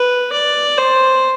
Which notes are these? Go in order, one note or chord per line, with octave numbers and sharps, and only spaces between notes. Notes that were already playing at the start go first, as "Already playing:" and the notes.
Already playing: B4
D5
C5